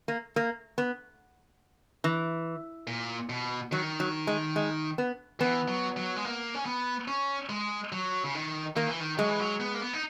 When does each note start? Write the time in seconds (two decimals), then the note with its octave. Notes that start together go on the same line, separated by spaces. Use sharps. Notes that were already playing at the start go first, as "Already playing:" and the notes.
0.08 A#3
0.36 A#3
0.78 B3
2.04 E3
2.87 A#2
3.29 B2
3.72 D#3 F#3
4.00 F#3
4.27 G#3
4.56 G#3
4.98 B3
5.40 E3 B3
5.68 F#3
5.97 F#3
6.16 G#3
6.25 A#3
6.54 C#4
6.66 B3
7.08 C#4
7.49 G#3
7.92 F#3
8.24 C#3
8.35 D#3
8.76 D#3 A#3
8.88 E3
9.00 D#3
9.18 F#3 G#3
9.29 E3
9.39 F#3
9.60 B3
9.74 A#3
9.81 B3
9.93 D#4